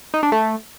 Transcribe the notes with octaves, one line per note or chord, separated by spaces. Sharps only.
D#4
D4
A3